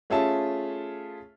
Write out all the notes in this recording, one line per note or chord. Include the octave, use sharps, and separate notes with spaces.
A3 C#4 F4 G#4 E5 A5